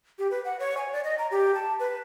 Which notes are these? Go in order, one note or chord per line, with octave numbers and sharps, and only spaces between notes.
G4
B4
F#5
C#5
G#5
D5
D#5
A#5
G4
A5
B4